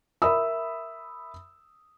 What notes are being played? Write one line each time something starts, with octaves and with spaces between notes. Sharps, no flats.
A#4 E5 B5 D#6 E6